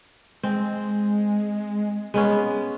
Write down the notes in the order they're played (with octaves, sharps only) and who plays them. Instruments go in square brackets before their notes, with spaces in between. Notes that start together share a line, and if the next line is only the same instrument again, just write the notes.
[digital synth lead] G#3 [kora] C4
[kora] G#3 B3 C#4